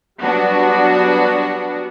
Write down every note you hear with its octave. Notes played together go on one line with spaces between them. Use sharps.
F#3 G3 B3 D4 F#4